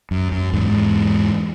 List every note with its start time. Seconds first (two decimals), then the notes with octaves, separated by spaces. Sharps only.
0.11 F#2
0.32 F#2
0.53 E2 G#2